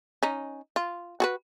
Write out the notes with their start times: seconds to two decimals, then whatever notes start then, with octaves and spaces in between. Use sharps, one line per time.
0.23 C#4 D#4
0.76 F4
1.20 F#4 G#4 B4